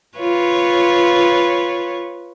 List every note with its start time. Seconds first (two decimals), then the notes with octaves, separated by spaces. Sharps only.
0.18 F4 B4 C#5